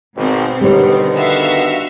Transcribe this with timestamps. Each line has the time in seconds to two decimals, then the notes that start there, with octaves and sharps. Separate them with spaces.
0.16 G#1 B2 C4
0.61 D3 D#3 G3 B3 C#5
1.16 F#4 E5 F5